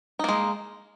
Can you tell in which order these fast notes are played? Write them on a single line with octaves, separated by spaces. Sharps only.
D#4 A#3 G#3